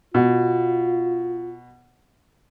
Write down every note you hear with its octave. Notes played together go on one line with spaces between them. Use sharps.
B2 F4